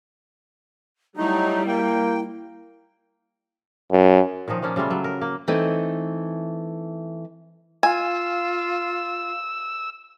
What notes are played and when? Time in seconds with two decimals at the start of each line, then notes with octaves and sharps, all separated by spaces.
1.17 F#3 G3 A3 D#4 E4
1.67 A#3 G5
3.91 F#2
4.48 A#2 D#3 F3 D#4
4.62 F3 A#3 C#4 D4
4.76 C#3 G3 A3 F4
4.90 F#3
5.04 A#4
5.21 A#3
5.48 E3 A3 C4 D#4
7.83 F4 F5 G#5 E6